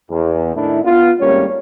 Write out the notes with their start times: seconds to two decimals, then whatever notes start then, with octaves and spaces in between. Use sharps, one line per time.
0.10 E2
0.55 A2 D#3 D4 E4
0.84 B3 F4
1.20 G#1 A2 G3 A#3 C#4 C#5